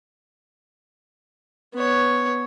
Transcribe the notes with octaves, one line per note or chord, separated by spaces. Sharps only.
B3 C#5